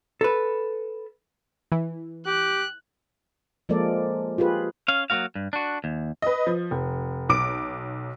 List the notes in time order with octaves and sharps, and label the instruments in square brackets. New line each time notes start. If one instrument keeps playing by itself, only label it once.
[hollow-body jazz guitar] A4 B4
[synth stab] E3
[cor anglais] G4 [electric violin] F#6
[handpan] F3 G#3 A#3 A4 A#4 D5
F4 G4 G#4 B4
[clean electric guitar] C#4 F5
F#3 A#3 C4 F#4 F5
G2
D4 F#4
D#2
[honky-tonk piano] B4 D#5
F3
F1
B1 D6 D7